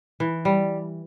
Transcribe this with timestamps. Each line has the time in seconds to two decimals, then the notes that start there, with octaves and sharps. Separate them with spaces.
0.20 E3
0.45 G3